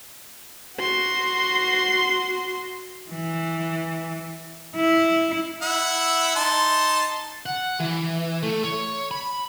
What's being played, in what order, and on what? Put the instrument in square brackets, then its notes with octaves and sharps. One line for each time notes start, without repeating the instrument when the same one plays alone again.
[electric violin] F#4 C6
[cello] E3
E4
[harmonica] E4 E5 F#5
D#4 A5 C6
[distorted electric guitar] F#5
E3
A3
C#5
B5